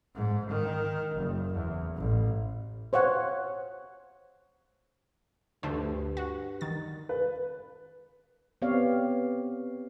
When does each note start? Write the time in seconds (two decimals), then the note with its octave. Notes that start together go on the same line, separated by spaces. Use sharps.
0.15 G#2
0.49 D#3
1.16 F#1
1.54 E2
1.96 A1
2.93 C5 C#5 F5 F#5
5.63 D2 G2 A3 C5
6.17 F#4
6.61 D#3 A6
7.09 B4
8.62 B3 C4 G4 C#5 D5 F5